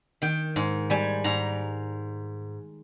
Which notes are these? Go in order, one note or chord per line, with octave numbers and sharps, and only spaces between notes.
D#3 G5
G#2
G3 G#5
G#2 A#5